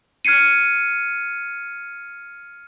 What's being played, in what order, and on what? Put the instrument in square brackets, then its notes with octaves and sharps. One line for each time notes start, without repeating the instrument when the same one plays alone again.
[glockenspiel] F6 G#6 C7 C#7 D#7